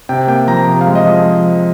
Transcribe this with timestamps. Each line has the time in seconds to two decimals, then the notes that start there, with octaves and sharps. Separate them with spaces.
0.09 C3 G5
0.27 A#3 G5
0.47 F3 A#5
0.67 C3
0.81 F5
0.87 G#3
0.95 D#5
1.05 F3